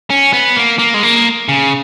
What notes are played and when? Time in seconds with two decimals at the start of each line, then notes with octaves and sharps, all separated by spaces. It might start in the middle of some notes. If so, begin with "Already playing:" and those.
0.10 C#4
0.33 B3
0.56 A#3
0.79 A#3
0.94 G#3
1.03 A#3
1.49 C#3